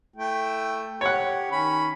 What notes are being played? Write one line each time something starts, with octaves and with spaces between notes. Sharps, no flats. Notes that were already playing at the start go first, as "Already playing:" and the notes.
A3 E4 G5
G4 C#5 F#5
D#3 C#4 B5